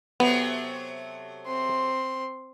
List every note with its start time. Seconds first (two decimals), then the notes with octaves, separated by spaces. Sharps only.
0.20 C3 F#3 A3 B3
1.47 C4 C6